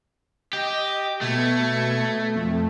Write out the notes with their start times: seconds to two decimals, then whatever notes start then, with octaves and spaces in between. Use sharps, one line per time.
0.53 G4 D#5
1.21 B2 A3 G#6 C#7
2.34 F2 A3